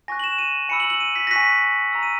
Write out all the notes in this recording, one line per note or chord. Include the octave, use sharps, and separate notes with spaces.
G#5 C#6 F#6 A#6
F#7
E7
D#7
G#5 B5 E6 C#7
F#7
F#7
D#7
B6
A#6
G#5 C#6 F#6 B6
A#5 E6
D#7